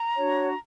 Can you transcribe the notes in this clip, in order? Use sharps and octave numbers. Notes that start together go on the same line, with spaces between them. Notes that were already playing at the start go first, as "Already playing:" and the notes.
Already playing: A#5
D4 F#4 C#5